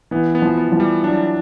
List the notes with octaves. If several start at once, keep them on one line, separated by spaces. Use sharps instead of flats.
E3 B3
B3
F3
B3
E3
F3
G3
F#3 D4